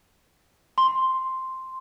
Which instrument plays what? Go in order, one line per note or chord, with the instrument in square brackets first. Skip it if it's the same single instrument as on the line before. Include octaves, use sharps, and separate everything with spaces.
[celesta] C6